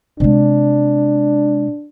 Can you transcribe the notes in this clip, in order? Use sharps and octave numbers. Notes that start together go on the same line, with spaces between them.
C3 G#3 D4